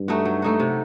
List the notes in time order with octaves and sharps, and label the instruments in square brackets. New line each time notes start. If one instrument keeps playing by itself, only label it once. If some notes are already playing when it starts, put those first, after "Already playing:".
Already playing: [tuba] G2
[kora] A3 D#4 F#4
F#3
A3 D#4 F#4
C3